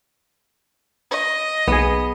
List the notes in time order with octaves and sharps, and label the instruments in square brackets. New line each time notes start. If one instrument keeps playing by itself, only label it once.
[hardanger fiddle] D#5
[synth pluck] B1 [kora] B3 G#4